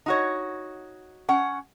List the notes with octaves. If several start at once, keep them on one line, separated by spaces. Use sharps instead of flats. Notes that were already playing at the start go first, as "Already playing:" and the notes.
D#4 F#4 C#5
C#4 F#5